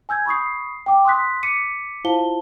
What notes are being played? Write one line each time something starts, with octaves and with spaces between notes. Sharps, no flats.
G#5 E6 G6 G#6
B5 C#6 D#6 C7
G5 D6
C6 D#6 F#6 B6
D6 B6 C#7 D#7
E4 F4 C5 F5 A5 G7